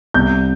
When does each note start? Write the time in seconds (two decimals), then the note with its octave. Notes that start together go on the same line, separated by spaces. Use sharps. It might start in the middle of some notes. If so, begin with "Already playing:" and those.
0.14 C2 G6